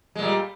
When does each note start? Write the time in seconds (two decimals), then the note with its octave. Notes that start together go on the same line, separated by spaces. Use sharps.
0.15 G#3
0.19 A#2
0.22 G3